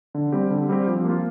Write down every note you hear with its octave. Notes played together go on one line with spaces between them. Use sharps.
D3
G3 C4 G4
D3
G3 C4 G4
F3
A#3 F4